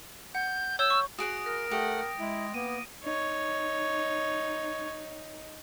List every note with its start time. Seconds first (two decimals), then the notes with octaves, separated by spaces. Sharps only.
0.35 F#5 G6
0.79 C#5 E6 G6 G7
0.90 C#6
1.18 F#4 G#4 F#5 D#6 D7
1.46 A#4 A#6
1.71 A3 G4 F#5
2.19 G#3 E4
2.54 A#3 B3 D#7
3.04 D#4 C#5